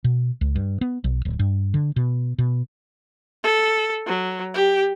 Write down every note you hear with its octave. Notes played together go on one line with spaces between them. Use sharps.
B2
C#2
G2
B3
B1
D1
G2
D3
B2
B2
A4
F#3
G4